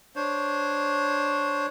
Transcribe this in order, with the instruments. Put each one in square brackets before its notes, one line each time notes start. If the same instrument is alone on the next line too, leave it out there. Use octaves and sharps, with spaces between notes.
[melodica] D4 C5 C#5